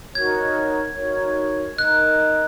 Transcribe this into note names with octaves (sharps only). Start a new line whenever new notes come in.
D#4 F#4 A#4 C#5 G#6
D#4 F#4 A#4 C#5
D#4 A#4 D#5 F#6